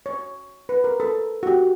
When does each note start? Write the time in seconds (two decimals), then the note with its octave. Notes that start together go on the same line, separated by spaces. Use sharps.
0.06 C#5
0.69 B4
0.84 A#4
1.00 A4
1.43 F#4
1.47 G4